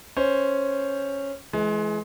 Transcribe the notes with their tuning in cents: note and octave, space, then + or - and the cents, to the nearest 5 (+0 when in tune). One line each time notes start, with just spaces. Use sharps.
C#4 -5 C5 +0
E3 +10 G#3 +30